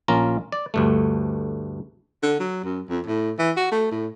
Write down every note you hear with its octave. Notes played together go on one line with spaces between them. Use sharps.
A#1 A#3 C#4 F4 A#5
D5
D2 G2 A3
D3
F#3
F#2
F2
A2
E3
F#4
A3
A2